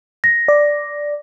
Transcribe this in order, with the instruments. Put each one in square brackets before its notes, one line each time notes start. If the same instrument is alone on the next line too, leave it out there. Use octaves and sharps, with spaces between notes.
[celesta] A#6
[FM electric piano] D5